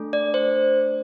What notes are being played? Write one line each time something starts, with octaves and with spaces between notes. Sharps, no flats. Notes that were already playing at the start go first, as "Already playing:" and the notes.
Already playing: A3 D4 A4
D5
C5